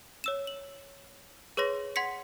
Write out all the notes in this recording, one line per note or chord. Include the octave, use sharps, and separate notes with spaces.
C#5 E6 E7
F#7
G#4 B4 C#5 C6 A#6
F#5 C6 G#6 B6 C#7